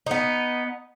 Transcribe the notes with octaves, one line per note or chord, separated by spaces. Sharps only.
B3 D#4